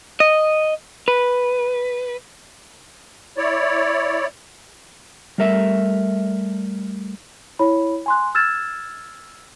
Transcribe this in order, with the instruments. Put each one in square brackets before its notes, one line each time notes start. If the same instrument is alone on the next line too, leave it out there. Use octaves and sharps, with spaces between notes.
[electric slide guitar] D#5
B4
[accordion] E4 C#5 D5
[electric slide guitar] G3 A3 A#4 E5
[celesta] E4 C#5 B5
G#5 C6 F#6
E6 F6 G#6 A6 E7